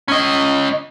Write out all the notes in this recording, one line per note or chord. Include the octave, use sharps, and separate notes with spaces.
C#4 D#5